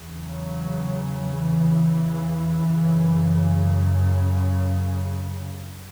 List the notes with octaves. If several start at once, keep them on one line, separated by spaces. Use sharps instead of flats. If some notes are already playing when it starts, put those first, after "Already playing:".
Already playing: E2 C#3
F#3
E3
F#2 C#3